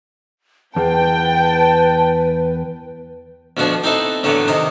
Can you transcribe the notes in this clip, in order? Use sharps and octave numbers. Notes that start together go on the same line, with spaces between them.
E2 B4 G5 A5
D2 B2 F3 D4 F#4 C#6
C4 D#4 E4 A4 B4 D5
A2 D3 E3 F#3 A3 B3
C3 D#3 D#5